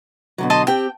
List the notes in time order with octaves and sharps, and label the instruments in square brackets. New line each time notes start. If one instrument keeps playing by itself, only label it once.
[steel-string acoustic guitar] B2 D3 F#3
[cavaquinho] D#5 A5 C6
[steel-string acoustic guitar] C4 G4 [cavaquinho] G5